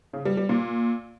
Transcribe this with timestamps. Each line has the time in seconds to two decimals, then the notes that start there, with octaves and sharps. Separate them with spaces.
0.13 C#3
0.25 G3
0.37 G3
0.49 A#2